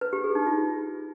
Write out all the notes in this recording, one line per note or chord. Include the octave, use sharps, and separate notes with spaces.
B4
G4
G#4
D#4
F4